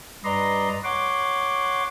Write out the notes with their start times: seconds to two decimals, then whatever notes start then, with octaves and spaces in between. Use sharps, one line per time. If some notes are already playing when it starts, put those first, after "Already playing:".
0.24 G2 B4 D5 D#5 A#5 C6
0.84 C#5 F#5 C6 D6